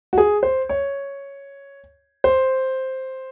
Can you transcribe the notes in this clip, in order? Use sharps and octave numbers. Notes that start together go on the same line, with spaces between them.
F#4
G#4
C5
C#5
C5